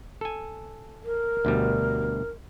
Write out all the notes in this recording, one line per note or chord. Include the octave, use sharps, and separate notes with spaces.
A4 G#5
A#4
D2 B2 G3